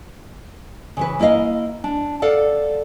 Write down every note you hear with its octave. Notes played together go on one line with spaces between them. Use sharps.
C#3 E3 B4
A#3 E4 F#4 D#5 F5
D4
A4 D5 F5 F#5